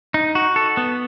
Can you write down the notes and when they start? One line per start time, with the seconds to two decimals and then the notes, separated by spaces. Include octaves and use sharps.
0.14 D#4
0.35 F#4
0.56 A4
0.77 B3